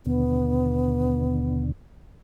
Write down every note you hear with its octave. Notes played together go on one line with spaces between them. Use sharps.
D#2 B2 D3 B3